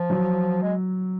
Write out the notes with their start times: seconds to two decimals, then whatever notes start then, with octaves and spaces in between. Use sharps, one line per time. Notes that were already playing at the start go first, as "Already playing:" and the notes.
Already playing: F3
0.10 F#3
0.62 G#3